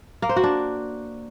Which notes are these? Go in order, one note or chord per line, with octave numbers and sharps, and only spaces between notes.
A#3
C5
F#4
D4